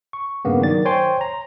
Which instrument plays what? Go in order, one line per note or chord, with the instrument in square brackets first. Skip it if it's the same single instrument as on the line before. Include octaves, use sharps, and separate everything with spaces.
[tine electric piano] C#6
G2 C#3 A#3 B3
D#3 F#3 D5 A6
C5 C#5 G5 G#5 C6
A#5